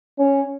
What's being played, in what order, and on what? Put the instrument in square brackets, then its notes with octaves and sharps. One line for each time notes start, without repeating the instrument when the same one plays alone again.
[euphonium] C#4